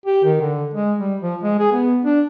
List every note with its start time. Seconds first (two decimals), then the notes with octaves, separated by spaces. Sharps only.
0.06 G4
0.24 D#3
0.41 D3
0.74 G#3
0.99 G3
1.21 F3
1.43 G#3
1.59 G#4
1.72 B3
2.05 D4